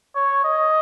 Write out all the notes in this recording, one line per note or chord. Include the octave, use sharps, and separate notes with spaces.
C#5
D#5